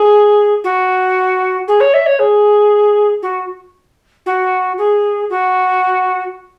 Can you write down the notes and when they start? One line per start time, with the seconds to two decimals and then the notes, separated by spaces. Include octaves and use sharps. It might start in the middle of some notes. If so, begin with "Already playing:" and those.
Already playing: G#4
0.64 F#4
1.68 G#4
1.80 C#5
1.93 E5
2.06 C#5
2.19 G#4
3.22 F#4
4.26 F#4
4.78 G#4
5.30 F#4